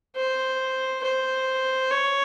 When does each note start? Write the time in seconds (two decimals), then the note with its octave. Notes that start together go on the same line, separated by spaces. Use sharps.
0.16 C5
1.03 C5
1.91 C#5